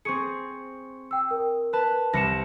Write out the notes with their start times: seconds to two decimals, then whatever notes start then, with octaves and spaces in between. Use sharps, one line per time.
0.05 C4 G#4 C#6 C#7
1.11 G5 E6
1.31 A#4
1.73 B4 A5
2.13 C2 A#6 C#7 E7